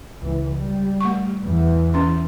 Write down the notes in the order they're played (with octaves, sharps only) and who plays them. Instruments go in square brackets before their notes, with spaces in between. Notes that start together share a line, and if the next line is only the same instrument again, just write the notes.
[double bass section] C#2 E3
G3
[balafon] A3 C#6
[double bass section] E2 E3
[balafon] C#4 C6